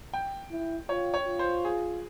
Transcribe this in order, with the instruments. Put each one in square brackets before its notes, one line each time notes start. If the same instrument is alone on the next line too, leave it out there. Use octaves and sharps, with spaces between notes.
[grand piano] G5
[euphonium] E4
[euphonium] F4 [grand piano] C#5
[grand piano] C#5
[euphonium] F4
[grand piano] C5
G#4